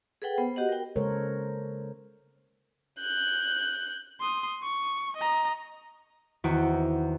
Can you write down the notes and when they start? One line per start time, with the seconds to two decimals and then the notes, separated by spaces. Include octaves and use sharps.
0.22 G#4 A4 B4 F#5 G5
0.38 B3 C5
0.56 F#4 G4 D#5 F#5
0.69 A#4 G5
0.96 C#3 G#3 A4 A#4 C5 C#5
3.00 F#6 G6
4.21 C6 D#6
4.63 C#6
5.17 D#5 A#5
6.44 E2 D#3 C4 E4 F#4 D7